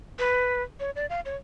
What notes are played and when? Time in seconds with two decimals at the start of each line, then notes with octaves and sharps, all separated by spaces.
0.19 B4
0.80 C#5
0.96 D5
1.10 F5
1.25 C#5